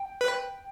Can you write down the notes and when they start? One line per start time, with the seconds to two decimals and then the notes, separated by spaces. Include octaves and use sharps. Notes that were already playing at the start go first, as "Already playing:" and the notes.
Already playing: G5
0.21 B4